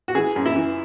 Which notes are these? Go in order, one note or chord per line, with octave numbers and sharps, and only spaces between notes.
F#4
E3 G#4
F#2
E4
E3